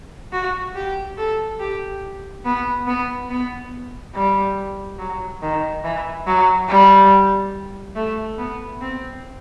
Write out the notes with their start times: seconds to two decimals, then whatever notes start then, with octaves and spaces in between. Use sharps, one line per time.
0.32 F#4
0.76 G4
1.17 A4
1.60 G4
2.45 B3
2.87 B3
3.30 B3
4.14 G3
4.99 F#3
5.42 D#3
5.84 E3
6.27 F#3
6.69 G3
7.96 A3
8.38 B3
8.81 C4